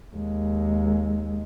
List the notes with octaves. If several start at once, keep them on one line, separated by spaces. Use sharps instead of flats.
D#2 G#3